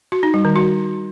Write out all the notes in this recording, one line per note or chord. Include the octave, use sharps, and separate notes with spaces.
F#4
D#4
G3
D#3
F#4